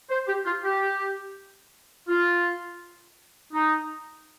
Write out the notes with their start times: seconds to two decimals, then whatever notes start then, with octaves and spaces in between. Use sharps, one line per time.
0.10 C5
0.27 G4
0.45 F4
0.64 G4
2.08 F4
3.53 D#4